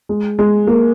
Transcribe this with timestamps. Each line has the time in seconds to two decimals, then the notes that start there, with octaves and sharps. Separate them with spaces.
0.09 G#3
0.39 G#3
0.67 A#3